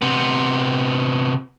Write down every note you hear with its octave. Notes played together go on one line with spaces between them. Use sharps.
C3 B3